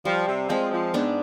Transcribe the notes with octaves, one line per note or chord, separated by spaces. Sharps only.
F3 G3
C3
F3 G#3 C4
F3
G#2 B3 D4